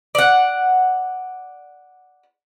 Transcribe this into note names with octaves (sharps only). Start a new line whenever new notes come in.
D5 F#5